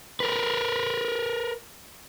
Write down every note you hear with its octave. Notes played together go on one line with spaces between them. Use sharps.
A#4 B4